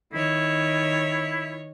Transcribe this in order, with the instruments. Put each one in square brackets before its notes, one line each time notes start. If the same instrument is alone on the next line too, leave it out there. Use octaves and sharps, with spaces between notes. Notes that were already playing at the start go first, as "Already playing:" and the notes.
[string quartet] D#3 C#5 [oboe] E4